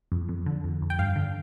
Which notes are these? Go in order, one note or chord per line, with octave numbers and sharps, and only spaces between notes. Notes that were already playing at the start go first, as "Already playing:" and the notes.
F2
F2
D3
F2
F2
G5
G2 F5
D3